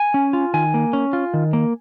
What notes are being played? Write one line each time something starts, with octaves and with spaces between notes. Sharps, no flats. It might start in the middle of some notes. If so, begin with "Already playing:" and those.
Already playing: G#5
C#4
F4
D#3 G#5
A#3
C#4
F4
D#3
A#3